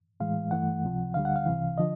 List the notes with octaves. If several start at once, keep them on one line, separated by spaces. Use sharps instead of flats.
A2 E3 G#3 F5
G2 E3 A3 F#5
C#2 C3 F3
D2 D3 G3 F5
F#5
F5
C2 C3 E3
D3 F3 D#5